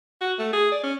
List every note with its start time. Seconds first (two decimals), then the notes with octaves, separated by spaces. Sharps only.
0.21 F#4
0.39 A3
0.53 G#4
0.72 D5
0.83 C#4